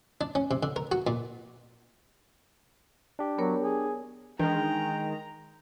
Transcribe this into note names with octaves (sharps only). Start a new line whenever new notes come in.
D4
C#4
C3
D3
A#4
F#4
A#2
D4 G4
F#3 B3 A#4 C#5
G#4
D#3 E3 G#3 D4 G5 A#5